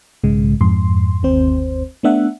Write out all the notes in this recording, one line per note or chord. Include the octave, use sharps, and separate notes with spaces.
B1 G#2 C#3 G#3
F2 G#2 C6
G1 D#2 C4 C5
A3 B3 D4 E5 F#5